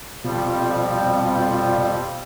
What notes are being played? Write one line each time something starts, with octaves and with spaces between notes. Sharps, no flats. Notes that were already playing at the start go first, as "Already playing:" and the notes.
F2 B2 F3 G3 F4